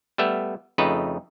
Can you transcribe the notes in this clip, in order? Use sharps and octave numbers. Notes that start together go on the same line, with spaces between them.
G3 A3 B3 E5
F2 C#3 A3 D#4 B4